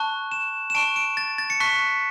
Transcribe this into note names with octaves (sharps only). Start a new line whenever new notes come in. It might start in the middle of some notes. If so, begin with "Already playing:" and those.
Already playing: A5 C#6 F#6
E7
E7
A5 C#6 F#6 D7
D7
A6
A6
C#7
A5 C#6 F#6 B6